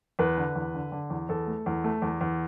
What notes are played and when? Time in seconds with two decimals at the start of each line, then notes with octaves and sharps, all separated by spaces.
0.19 E2 B4
0.38 D3
0.55 E2
0.75 D3
0.92 D3
1.10 E2
1.29 E2 A4
1.47 A3
1.66 E2
1.84 A3
2.02 E2
2.21 E2